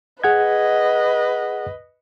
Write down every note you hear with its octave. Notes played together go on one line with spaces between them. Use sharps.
G#4 B4 D#5 F#5 G#6